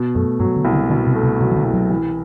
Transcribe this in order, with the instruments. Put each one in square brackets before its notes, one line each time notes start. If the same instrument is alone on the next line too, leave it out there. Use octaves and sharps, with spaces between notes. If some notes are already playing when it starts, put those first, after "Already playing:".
Already playing: [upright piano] B2
[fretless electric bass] F#2 [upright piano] A3
[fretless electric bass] G2 [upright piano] F#3
[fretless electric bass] D3
[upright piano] C2
[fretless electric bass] D3
[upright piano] B2 [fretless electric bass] D3
[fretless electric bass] C3
[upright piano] A3
[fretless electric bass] C3
[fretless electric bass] C3 [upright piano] F#3
[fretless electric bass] E3
D3
[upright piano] C2
[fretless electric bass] F#3
[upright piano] E3